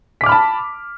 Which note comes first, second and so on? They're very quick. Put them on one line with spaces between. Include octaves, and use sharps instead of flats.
B6 D6 F6 B5 A5